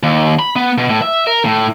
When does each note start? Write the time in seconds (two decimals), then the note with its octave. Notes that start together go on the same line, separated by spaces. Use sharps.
0.03 D#2
0.39 B5
0.56 B3
0.78 B2
0.90 A2
1.02 E5
1.27 A#4
1.45 A2